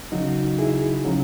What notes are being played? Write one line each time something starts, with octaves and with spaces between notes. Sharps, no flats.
C#2 C#3 F#3 D#4 F#4
E4 G#4
C#3 F#3